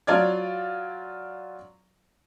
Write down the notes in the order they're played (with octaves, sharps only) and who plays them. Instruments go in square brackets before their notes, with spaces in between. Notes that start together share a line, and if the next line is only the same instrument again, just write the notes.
[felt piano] F#3 F4 D5 F6 G#6